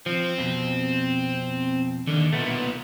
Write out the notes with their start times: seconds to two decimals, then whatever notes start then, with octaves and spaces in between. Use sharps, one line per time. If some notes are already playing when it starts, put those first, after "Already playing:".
0.06 F3 C4
0.38 F2 B2
2.08 D#2 D3
2.33 B1 A#2 A3 B3
2.46 B3